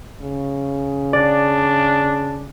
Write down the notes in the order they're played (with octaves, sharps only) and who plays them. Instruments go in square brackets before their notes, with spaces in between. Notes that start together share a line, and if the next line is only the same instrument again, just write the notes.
[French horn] C#3
[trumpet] D4 [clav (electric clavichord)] D5